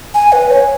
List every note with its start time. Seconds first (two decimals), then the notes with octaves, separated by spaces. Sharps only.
0.14 G#5
0.32 B4
0.50 C#5